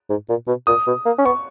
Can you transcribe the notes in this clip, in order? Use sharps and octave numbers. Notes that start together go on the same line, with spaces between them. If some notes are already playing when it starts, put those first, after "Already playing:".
G#2
A#2
B2
A#2 D#6
B2
A#3
C#4
B3 C#6